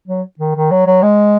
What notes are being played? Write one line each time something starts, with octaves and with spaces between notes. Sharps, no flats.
F#3
D#3
D#3
F#3
F#3
G#3